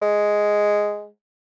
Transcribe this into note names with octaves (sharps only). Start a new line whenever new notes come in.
G#3